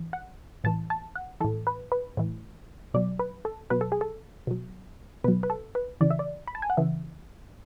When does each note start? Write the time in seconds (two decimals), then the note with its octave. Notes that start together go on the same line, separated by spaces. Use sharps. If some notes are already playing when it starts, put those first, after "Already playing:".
Already playing: E3
0.13 F#5
0.64 A2 E3 A5
0.90 A5
1.15 F#5
1.41 A2 E3 A4
1.67 B4
1.92 B4
2.17 A2 E3
2.94 B2 F#3 D5
3.19 B4
3.45 A4
3.70 B2 F#3 B4
3.81 A4
3.92 G#4
4.01 A4
4.47 B2 F#3
5.24 B2 F#3 B4
5.43 B4
5.50 A4
5.75 B4
6.01 C#3 E3 D5
6.11 E5
6.19 D5
6.48 B5
6.55 A5
6.62 G#5
6.70 F#5
6.77 C#3 E3 E5